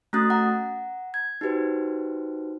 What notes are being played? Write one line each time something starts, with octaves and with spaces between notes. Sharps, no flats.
A3 C#4 F#4 D#6 F#6 A6
F#5 A#5
G#6
D#4 F#4 G4 B4 C5